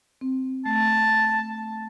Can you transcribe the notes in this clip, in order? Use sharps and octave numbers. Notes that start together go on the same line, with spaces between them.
C4
A3 A5